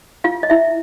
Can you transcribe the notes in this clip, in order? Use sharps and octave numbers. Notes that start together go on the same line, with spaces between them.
F4 F5
D#5
E4 E5